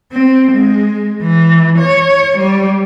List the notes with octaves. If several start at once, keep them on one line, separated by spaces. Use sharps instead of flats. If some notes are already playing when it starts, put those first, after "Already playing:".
C4
G#3
E3
C#5
G3